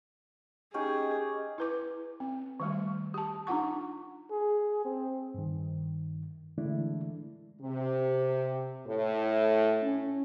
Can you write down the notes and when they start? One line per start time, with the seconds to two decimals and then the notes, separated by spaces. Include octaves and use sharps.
0.74 C#4 D#4 G4 G#4
1.58 E4 B4 D6
2.20 C4
2.60 D#3 G3 A3
3.14 G4 A5
3.47 D4 D#4 F4 F#5 C#6
4.31 G#4
4.85 C4
5.34 G2 D#3
6.58 D3 E3 G#3 A3 D4 E4
7.61 C3
8.86 A2
9.81 C#4